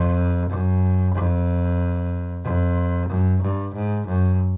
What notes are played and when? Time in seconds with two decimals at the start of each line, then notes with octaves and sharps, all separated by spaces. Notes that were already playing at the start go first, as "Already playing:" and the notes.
Already playing: F2
0.49 F#2
1.15 F2
2.45 F2
3.09 F#2
3.42 G2
3.74 G#2
4.07 F#2